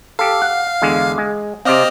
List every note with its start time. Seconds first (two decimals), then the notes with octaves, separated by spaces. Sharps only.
0.19 G4 A4 F5
0.42 F#5
0.82 E2 D3 G#3
1.18 G#3
1.65 C3 C4 D5 D#5 F5 F6